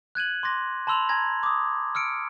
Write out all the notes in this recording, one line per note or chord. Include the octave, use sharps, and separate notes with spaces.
F#6 G#6 D#7 F#7
C6 D6 A6 A#6
A5 B5 C6 E6 F7 F#7
G#5 A#5 G#6 A#6
D6 D#6
E6 F6 C#7 D7